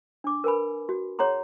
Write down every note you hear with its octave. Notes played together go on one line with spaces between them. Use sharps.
D4 D6
A#4 B4 G#5 B5
F#4
G#4 C#5 F#5 A#5 C6